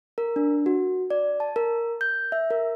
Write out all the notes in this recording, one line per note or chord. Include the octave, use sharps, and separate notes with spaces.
A#4
D4
F#4
D5
A5
A#4
G6
E5
A#4